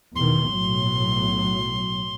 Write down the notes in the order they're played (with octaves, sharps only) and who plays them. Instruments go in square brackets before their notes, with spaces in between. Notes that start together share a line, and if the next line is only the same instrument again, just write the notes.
[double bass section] E2 B2 D#3 [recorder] C6
[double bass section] B1 A2 F#3